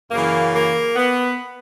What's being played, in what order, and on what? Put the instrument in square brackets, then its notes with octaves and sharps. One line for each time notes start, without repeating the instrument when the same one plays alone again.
[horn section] F#2 C#3 E3 A#3
A#3
B3